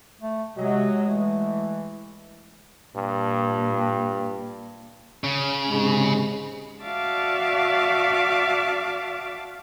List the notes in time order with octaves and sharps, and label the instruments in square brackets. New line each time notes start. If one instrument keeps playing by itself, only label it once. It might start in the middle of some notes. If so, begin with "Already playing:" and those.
[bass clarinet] A3
[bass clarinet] C3 [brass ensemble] F#3 D#5 [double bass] G#3
[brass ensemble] E3 [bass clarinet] A3
[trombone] G2 [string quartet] A#2
[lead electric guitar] C#3
[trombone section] G#2 C3 G#3
[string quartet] F#4 D5 E5 F5 A5 D6